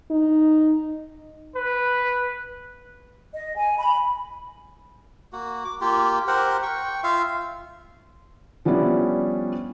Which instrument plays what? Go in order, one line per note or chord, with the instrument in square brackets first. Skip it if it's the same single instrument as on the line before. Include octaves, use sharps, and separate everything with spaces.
[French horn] D#4
[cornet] B4
[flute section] D#5
G#5
B5
[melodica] A#3 F#4
D6
A#3 F4 G4
G4 A#4 C5 F#5
G5 C#6
F4 E5 F5
[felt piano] F3 G3 B3 C#4 D4 E4